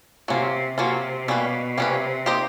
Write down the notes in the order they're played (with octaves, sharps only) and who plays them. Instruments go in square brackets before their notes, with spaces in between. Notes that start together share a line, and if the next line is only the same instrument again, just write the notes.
[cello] C3 [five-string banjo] F#3 A#3 C#4 F4
[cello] C3 [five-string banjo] F#3 A#3 C#4 F4
[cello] B2 [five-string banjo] G3 A#3 C#4 F#4 B4
[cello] C3 [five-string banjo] G3 A#3 C#4 F#4 B4
[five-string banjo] A#3 D#4 G4 C5 D#5